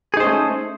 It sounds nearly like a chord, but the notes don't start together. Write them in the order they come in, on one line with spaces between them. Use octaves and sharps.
G#4 D#4 C5 C#4 A3